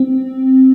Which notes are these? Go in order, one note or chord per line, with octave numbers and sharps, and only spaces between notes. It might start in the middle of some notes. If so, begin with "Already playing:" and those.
Already playing: C4